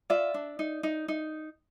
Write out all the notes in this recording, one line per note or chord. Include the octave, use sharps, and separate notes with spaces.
F4 D5 E5
D4
D#4
D#4
D#4